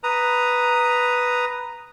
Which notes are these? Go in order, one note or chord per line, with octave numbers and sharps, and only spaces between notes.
B4 A#5 D#6